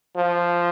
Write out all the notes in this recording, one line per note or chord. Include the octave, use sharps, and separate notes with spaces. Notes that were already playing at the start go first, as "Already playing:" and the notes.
F3